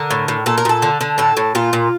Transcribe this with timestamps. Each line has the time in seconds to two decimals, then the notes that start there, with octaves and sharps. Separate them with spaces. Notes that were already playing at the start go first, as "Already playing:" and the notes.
Already playing: D3 A#4
0.11 A2
0.28 A2
0.46 A#2 A4
0.58 A#4
0.65 A#2 A4
0.82 D3
1.01 D3
1.18 A2 A4
1.37 A2
1.55 A#2 F4
1.73 A#2